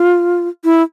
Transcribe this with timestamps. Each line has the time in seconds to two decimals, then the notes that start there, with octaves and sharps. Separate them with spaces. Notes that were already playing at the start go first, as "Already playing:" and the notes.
Already playing: F4
0.65 E4